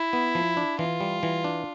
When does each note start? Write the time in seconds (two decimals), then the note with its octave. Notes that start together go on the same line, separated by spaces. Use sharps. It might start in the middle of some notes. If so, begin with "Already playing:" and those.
Already playing: E4
0.13 B3
0.35 F3
0.57 D4
0.79 E3 F4
1.01 G3
1.23 E3
1.44 D4